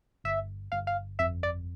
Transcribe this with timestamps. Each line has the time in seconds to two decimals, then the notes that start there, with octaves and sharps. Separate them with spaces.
0.24 G1 E5
0.72 G1 F5
0.87 F5
1.19 F2 E5
1.43 D5